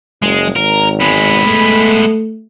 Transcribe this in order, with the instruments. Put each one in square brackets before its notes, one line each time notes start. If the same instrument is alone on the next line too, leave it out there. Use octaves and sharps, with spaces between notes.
[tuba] F#1 [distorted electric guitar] G#3
[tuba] G#1 [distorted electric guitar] A#4
[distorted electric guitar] G#3 B3 [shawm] B5
[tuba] A3